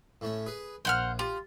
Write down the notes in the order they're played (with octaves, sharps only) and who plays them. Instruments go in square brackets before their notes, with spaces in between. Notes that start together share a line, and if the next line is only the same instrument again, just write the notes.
[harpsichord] A2 A3 C#4
G#4 B4
[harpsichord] A#1 [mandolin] C5 F#5 F6
[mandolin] F4 [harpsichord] G4